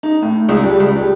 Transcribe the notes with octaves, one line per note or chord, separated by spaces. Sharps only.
D#4
A2
C#2
G3
C#2
G3